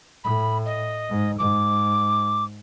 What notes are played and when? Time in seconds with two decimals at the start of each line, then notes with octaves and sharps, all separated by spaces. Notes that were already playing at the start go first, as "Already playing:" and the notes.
0.24 A2 B5
0.65 D#5
1.09 G#2
1.39 G#2 D6